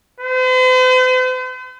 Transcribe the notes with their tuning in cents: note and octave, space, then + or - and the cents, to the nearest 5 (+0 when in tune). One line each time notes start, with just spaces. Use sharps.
C5 -45